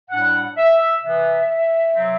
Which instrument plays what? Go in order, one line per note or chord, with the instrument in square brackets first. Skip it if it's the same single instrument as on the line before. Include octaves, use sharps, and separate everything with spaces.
[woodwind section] A2 G3 D4 F#5
E5
C3 E3 B3 E5
C3 F#3 C4